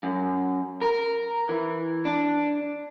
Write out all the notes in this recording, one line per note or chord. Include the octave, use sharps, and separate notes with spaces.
F#2
A#4
E3
D4